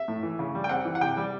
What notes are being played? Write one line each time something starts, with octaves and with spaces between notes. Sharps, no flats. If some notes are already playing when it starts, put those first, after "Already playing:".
Already playing: E5
A2
E3
C#3
G3
G5
C4 F#5
E3
F#5
C3 G5
G3